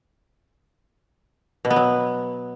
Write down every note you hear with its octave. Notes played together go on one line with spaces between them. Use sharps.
B2
B3
F#3